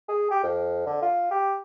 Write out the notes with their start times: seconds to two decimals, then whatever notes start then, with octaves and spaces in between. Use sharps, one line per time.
0.09 G#4
0.31 G4
0.43 F2
0.86 D3
1.02 F4
1.31 G4